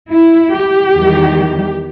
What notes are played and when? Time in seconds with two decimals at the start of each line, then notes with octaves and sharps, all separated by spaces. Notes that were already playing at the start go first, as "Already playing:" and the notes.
0.11 E4
0.52 G4
0.94 E2 D#3 G3